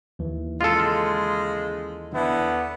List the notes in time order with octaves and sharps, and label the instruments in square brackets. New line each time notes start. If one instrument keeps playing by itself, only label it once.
[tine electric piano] D#2 E3
[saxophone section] C#3 G#3 [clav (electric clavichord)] F4 A4
[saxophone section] D3 D4 E4 [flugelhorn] B3